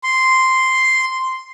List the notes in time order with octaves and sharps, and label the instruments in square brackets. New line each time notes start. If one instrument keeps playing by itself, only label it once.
[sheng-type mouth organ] C6